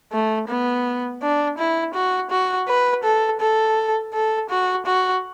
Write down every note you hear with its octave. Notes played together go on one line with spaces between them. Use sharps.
A3
B3
D4
E4
F#4
F#4
B4
A4
A4
A4
F#4
F#4